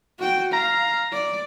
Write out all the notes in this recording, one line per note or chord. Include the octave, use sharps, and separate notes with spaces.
F#4 G5
F5 A#5
D5